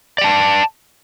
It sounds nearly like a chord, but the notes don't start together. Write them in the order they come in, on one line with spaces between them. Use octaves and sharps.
D5 G5 A5